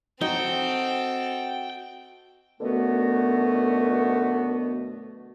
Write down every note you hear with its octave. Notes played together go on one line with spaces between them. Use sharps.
C4 D#4 F#4 A4 G5
F#2 B2 D3 A3 B3 F#4